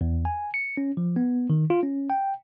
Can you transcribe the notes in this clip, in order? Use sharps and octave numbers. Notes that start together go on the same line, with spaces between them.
E2
G#5
C#7
C#4
F3
B3
D#3
F4
C#4
G5